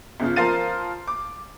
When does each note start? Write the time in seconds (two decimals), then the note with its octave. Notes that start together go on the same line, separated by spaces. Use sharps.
0.20 G1 C#3 F4
0.36 F3 A#4 C5 F5 A6 D#7
1.07 D6